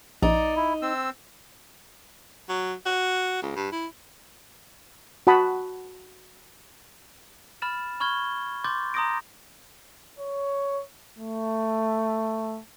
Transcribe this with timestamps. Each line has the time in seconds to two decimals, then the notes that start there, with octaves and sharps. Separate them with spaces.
0.22 A#1 D#4 D5
0.56 E4
0.82 C4 E6
2.49 F#3
2.86 F#4
3.42 C#2
3.56 G2
3.72 E4
5.27 F#4 F#5 A5 B5 D#6
7.62 B5 F6 A6 E7
8.00 B5 C#6 F6 G#6 G7
8.64 C6 D6 G6 A6
8.94 A#5 C6 D#6 G6 A#6 D7
10.19 C#5
11.19 A3